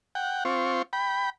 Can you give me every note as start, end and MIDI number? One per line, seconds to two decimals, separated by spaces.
0.15 0.44 78
0.15 0.44 79
0.45 0.82 60
0.45 0.82 65
0.45 0.82 85
0.93 1.30 79
0.93 1.30 83